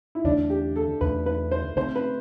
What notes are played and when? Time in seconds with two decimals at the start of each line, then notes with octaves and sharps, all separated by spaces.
0.15 E4
0.24 E2 D3 A3 D4
0.50 G4
0.76 A4
1.01 E2 D3 A3 B4
1.26 B4
1.51 C5
1.76 D2 D3 A3 C4 C5
1.96 B4